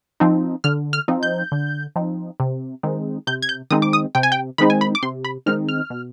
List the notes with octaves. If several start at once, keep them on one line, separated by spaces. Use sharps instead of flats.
F3 C4 D#4
D3 F6
F6
F3 C4 D#4
G6
D3
F3 C4 D#4
C3
D#3 G#3 C4 D#4
C3 G6
G#6
G6
D#3 G#3 C4 D#4 D#6
D6
D#6
C3 G5
G#5
G5
D#3 G#3 C4 D#4 B5
G#5
B5
D6
C3 C6
B5
D#3 G#3 C4 D#4 F6
F6
B2